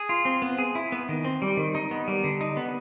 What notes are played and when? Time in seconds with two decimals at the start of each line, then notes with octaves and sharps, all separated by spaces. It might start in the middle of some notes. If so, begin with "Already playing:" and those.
Already playing: G#4
0.09 F4
0.25 C4
0.42 B3
0.58 G#4
0.75 E4
0.92 B3
1.09 D#3
1.24 C4
1.42 G3
1.57 D#3
1.75 D#4
1.91 B3
2.08 G3
2.24 D3
2.41 D#4
2.57 B3